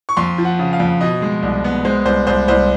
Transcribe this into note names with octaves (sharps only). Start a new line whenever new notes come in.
C#6
F2 C6
F3
F#5
C#3
F5
F2
B2 D#5
G#3
C2
B3
G#3 C5
C2 C5
C2 C5
C2 C5